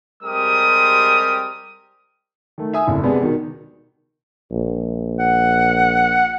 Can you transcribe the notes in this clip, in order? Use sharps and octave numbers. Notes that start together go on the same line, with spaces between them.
G3 G#3 C4 G4 A#4 D#6
D#3 A3
E5 G#5 D#6
F#1 D3 E4
C3 G#3 B3 D4 G#4
B2 D#3
A#1
F#5